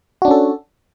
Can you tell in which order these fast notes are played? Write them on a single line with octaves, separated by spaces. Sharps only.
F#4 D4 C#4 A4